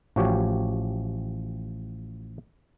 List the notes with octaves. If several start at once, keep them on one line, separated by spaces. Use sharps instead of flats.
A1 F3 F#4 G4 C#5